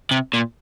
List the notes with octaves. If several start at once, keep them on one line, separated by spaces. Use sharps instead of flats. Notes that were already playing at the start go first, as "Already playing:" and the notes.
C3
A#2